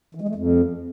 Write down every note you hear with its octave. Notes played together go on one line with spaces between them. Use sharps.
E3
G#3
A3
F2